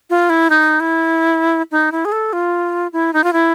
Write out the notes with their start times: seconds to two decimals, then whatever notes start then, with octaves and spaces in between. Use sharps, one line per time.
0.10 F4
0.30 E4
0.50 D#4
0.80 E4
1.71 D#4
1.92 E4
2.05 G#4
2.12 A4
2.33 F4
2.93 E4
3.13 D#4
3.24 F4
3.33 E4